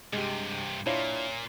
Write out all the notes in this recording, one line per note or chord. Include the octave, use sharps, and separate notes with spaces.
G2 C3 G#3 G4
A#2 D4 E4 F4 C#5